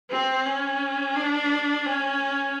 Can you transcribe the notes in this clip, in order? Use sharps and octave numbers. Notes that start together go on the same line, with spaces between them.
C4
C#4
D4
C#4